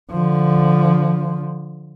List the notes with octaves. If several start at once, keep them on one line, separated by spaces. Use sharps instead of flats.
D3 F3